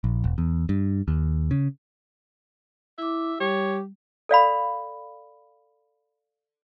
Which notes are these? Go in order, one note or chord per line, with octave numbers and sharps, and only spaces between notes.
A#1
E1
E2
G2
D#2
C#3
E4 E5 D6
G3 G4 C#5
A4 D5 F5 B5